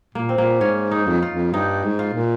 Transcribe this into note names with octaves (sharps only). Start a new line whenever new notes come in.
A#2 A#3
C4
A#2 A#3
G#2 C#4
D#4
F2
F4
F2
G2 D#4
G#2
F4
A#2